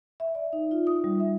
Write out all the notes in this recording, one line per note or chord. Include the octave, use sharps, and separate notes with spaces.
E5
D5
D#4
F4
D#6
G3
E5